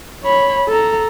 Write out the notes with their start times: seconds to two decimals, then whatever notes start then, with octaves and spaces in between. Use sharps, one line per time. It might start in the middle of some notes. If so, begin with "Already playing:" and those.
0.23 C#5 B5
0.68 A4 A#5